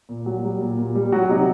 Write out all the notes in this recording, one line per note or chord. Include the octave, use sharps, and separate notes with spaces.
A#2
F#3
G3
A#2
A#2
G3
F#3 F#4
C3 D#4